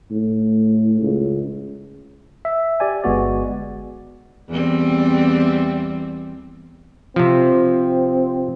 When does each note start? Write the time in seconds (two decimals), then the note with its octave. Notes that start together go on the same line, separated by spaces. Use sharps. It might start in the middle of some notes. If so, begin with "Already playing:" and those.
0.11 A2
1.02 C#2
2.45 E5
2.80 G4 D5 G#5
3.04 G1 G#3 B3 F#4 D5
4.49 E2 G3 C4
7.16 C3 F3 C4